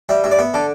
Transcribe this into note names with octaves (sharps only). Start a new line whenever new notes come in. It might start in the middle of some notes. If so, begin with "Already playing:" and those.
G3 E5
G2 E5
D5
B3 E5
D3 A4